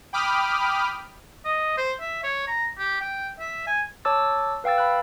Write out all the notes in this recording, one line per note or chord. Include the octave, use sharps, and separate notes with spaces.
G5 B5 D6 D#6 F6
D#5
C5
E5
C#5
A#5
G4
G5
E5
G#5
C#5 A5 D6 E6 A6
B4 F5 G5 E6 A6
B5 F#6